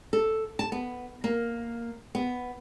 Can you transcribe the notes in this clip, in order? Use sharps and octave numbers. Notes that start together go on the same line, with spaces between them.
A4
A5
B3
A#3
B3